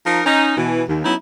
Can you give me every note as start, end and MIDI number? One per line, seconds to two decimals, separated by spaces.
0.06 0.21 53
0.06 0.21 63
0.06 0.21 70
0.25 0.55 61
0.25 0.55 63
0.57 0.82 47
0.57 0.82 52
0.89 1.01 39
1.04 1.13 54
1.04 1.13 59
1.04 1.13 61
1.04 1.13 63
1.04 1.13 64